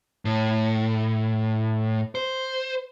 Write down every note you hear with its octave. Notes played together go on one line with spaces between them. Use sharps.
A2
C5